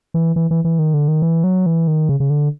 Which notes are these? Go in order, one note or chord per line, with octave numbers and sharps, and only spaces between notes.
E3
E3
E3
E3
D#3
D3
D#3
E3
F#3
E3
D#3
C#3
C#3
D3